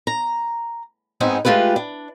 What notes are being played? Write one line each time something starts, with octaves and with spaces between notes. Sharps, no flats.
A#5
G#2 B3 C4 D#4 G#5
G#3 A3 F4 G4 B4
D4